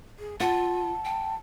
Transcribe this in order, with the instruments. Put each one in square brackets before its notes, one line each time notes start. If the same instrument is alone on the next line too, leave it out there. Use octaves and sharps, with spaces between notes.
[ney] G#4
[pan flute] F4 [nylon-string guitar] F#5 [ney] A5
[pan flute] G5